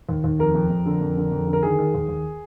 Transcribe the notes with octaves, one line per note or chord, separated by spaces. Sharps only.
D#2
D#2
F2 A#4
F2
F2
D3
F2
D3
F2
D3
A#4
D#3 G#4
D#3
D#2
D#2